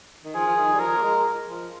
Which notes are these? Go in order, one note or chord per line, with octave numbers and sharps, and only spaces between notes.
D#3
F3 G#4
F3
D#3
G3
F3 A#4
A#3
G#3
F3